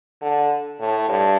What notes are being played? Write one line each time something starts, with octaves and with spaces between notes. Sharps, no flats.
D3
A2
G2